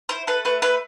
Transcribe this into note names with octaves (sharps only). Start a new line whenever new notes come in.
E4 C5
A4 B4
A3 B4
A3 B4